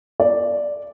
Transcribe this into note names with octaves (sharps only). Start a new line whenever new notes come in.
D5